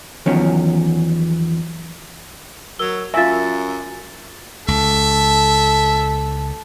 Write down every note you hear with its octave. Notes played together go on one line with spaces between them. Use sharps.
E2 D#3 F3 F#3 C#4
F#3 A#4 E6 G7
F#2 F4 E5 G#5 A6
C#2 A4 E5